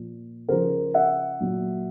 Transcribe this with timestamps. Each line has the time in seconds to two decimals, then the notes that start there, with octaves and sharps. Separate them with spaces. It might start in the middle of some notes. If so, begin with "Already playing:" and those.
Already playing: A#2 F3
0.48 C#3 F3 A#4 C5
0.94 E5 F#5
1.40 A#2 F#3